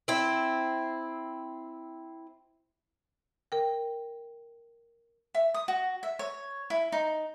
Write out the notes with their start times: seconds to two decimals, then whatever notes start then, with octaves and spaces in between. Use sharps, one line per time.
0.08 C4 E4
3.52 A#4 G5
5.34 E5
5.54 D#6
5.68 F#4
6.03 E5
6.19 C#5
6.70 E4
6.92 D#4